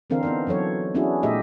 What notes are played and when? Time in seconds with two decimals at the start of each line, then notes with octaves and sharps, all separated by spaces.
0.10 D3 E3 C4 D4 A#4 F5
0.23 B3 D#4 C5
0.47 E3 F#3 A4 C#5
0.95 B3 C#4 D4 E4 F#4 G#4
1.23 A#2 A3 D#4 G4 D#5 E5